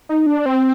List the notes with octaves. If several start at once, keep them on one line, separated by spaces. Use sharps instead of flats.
D#4
D4
C4